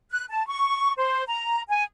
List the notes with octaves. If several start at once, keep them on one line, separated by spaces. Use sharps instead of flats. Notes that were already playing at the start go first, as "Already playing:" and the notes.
F#6
A5
C#6
C5
A#5
G#5